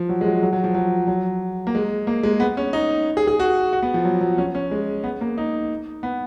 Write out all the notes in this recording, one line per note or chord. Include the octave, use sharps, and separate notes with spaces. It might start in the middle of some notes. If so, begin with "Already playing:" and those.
Already playing: F3
F#3
G#3
F#3
F#3
F#3
F3
F#3
F#3
A#3
G#3
A#3
G#3
B3
C#4
D#4
G#4
G#4
F#4
F#4
B3
F3
F#3
F#3
C#4
C#4
G#3
B3
A#3
D#4
B3